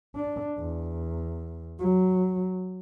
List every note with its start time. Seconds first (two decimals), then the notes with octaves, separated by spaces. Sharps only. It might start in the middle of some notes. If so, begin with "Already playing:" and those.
0.15 D4
0.58 E2
1.79 F#3